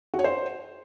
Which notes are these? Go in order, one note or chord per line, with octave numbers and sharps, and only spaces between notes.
F#4
C#5
C5